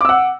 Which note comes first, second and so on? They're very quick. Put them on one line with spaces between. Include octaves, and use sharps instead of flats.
D6 E6 F#5